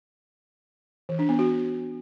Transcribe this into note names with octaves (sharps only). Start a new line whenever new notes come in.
E3
D4
B3
F#4